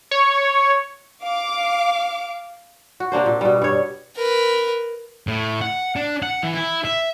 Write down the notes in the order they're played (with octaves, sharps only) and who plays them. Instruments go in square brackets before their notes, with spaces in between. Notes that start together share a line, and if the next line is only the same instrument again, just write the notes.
[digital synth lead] C#5
[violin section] F5 D6
[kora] F#4
C3 A#3 D4 C5
A#2
B2 G3
G2 C#5
[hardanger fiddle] A#4 B4
[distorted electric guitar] A2
F#5
D4
F#5
E3
E4
E5